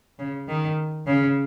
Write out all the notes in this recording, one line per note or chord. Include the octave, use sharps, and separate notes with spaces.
C#3
D#3
C#3